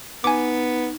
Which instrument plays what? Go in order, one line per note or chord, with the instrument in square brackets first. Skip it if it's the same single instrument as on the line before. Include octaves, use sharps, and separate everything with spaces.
[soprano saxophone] B3 [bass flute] D#4 [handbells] G#5 D6